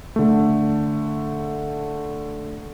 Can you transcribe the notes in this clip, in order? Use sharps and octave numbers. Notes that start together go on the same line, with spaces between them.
D3 A3